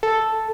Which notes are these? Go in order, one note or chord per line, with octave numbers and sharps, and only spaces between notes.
A4